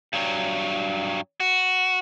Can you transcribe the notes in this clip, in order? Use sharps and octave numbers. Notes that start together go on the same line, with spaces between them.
G2 F#3
F#4